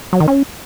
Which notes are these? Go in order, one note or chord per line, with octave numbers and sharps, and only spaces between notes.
F#3
D#3
C#4